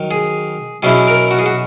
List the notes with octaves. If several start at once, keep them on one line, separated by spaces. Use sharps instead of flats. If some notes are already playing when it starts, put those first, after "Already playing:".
Already playing: D#3 F#3
G#4
B2 F#3 C#4 E4 G#4
A#4
F#4
G#4
F#4